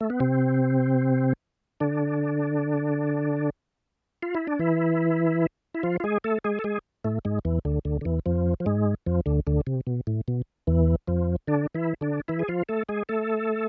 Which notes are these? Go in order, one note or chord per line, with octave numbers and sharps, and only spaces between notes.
A3
B3
C3 C4
D3 D4
F4
E4
D4
E3 E4
E4
F3 F4
F4
G#3 G#4
A3 A4
G#3 G#4
A4
G#3 G#4
A2 A3
G#2 G#3
E2 E3
D2 D3
D2 D3
D3
E2 E3
F2 F3
F3
G#2 G#3
F2 F3
D2 D3
D2 D3
C3
B2
A2
B2
E2 E3
F2 F3
D3 D4
E3 E4
D3 D4
E3 E4
G#4
F3 F4
A3 A4
G#3 G#4
A3 A4